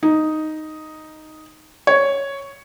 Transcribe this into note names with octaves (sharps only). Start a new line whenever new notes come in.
D#4
C#5